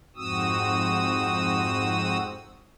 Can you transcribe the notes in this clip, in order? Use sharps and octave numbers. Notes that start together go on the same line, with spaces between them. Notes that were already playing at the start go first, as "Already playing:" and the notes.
F2 G#2 C4 F#4 D#6 E6